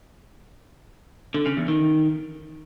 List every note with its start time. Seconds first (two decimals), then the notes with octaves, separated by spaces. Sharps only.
1.34 D3
1.46 C#3
1.57 E2
1.68 D#3